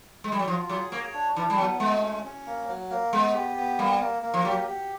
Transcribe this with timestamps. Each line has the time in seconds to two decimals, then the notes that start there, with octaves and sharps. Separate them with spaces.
0.24 G#3
0.32 G3
0.39 F#3
0.48 F3 F4
0.69 F#3 G#4
0.92 A#3 C#5
1.14 D4
1.36 E3 D4
1.50 G3
1.58 F#3 B3
1.80 G#3 A3
2.02 C#4
2.25 C#4
2.46 A#3
2.68 F#3
2.90 A#3
3.12 G#3 B3
3.35 G4
3.57 B3
3.79 G3 A#3
4.01 A#3
4.23 A#3
4.34 F3
4.45 F#3 G4
4.67 G4